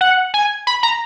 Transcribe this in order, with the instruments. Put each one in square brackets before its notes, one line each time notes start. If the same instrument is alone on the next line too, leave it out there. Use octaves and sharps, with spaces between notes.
[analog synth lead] F#5
G#5
B5
A#5